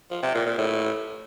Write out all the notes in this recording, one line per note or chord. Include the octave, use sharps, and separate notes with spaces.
F3
C3
A#2
A#2
A2